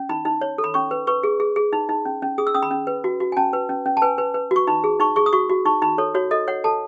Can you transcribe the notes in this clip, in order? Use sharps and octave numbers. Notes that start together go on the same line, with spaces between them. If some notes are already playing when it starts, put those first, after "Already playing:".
Already playing: C#4
D#4 B5
D#4
C#5
A4
B5
C#4 C#6
B4
B4 C#6
G#4
G#4
G#4
D#4
D#4
C#4
C#4
G#4 D#6
E6
C#4 D#6
B5
C#4
B4
F#4
F#4
G#5
C#4 A5
B4
C#4
C#4
A5
B4 G#5
B4
B4
F#4 C#6
D#4 B5
G#4
D#4 C#6
G#4 C#6
D#6
F#4 C#6
F#4
D#4 C#6
D#4 B5
A4 C#5
F#4 C#5
A4 D#5
C#5 F#5
A4 A5